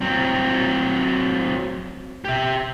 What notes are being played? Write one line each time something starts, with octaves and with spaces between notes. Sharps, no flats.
F#3 C4
G4 E5